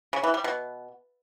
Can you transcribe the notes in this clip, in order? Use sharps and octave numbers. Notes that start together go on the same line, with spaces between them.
C#3
E3
G3
B2